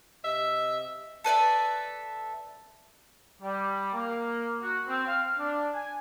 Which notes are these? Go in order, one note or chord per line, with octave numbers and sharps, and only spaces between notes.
C3 G4 D#5 E5
A4 B4 D5 E5
G3
A#3
F#4
C4
F5
D4
G#5